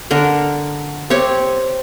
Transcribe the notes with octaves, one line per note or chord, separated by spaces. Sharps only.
D3 A#4
C4 G4 C#5